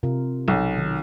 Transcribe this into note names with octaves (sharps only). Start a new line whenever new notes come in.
C3 F4 A#4
B1
D#3